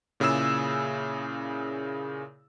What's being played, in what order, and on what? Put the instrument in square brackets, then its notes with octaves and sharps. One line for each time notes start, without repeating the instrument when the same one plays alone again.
[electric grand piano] A#2 C#3 E4 G#4 E6 E7